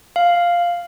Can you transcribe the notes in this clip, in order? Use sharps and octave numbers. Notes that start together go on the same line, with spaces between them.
F5